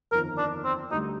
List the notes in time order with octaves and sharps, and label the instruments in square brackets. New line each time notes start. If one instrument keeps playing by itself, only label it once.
[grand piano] G1 F2 D#3 [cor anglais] A#4
[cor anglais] D4
C4
[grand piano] D2 D3 G3 [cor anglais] D#4